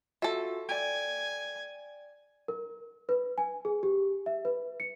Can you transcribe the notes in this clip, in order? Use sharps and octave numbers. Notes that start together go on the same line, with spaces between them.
F4 F#4 A4 E5
D5 G5 G#5
A#4
B4
G#5
G#4
G4
E5
B4
C#7